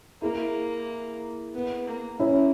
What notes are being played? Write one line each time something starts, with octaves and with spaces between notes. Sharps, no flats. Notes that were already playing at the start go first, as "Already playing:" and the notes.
A#3 E4 G#4
B3
A#3
A#3 C#4 E4